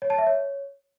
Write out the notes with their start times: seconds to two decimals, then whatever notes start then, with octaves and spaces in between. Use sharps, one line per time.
0.02 C#5
0.10 A5
0.18 E5
0.27 C#5